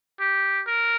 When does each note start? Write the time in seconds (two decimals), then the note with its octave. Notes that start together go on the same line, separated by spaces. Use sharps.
0.20 G4
0.67 A#4